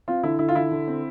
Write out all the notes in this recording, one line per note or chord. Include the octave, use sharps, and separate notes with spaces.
C4 F4
D3 E4
D3 E4
F4
D3 E4
D3
C4